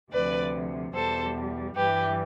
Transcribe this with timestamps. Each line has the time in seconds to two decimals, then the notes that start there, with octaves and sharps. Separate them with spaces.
0.12 D2 C3 F3 B4 D5
0.93 E2 B2 G3 A4 C5
1.75 G2 E3 G3 G4 B4